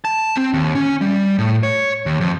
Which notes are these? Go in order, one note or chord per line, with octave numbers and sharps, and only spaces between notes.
A5
C4
D#2
C#4
G3
A2
C#5
D#2
F2